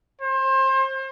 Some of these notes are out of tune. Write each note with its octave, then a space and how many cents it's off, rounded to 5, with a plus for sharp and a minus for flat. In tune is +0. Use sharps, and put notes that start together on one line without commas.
C5 +30